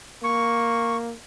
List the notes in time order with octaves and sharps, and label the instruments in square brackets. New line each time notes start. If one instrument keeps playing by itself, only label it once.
[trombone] A#3 [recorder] C#6